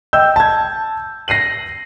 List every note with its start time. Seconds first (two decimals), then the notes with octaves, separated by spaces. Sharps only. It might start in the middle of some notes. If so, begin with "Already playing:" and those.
0.13 D#5 G5 E6 G6
0.36 A5 G#6
1.28 A#6 C7 D#7 F#7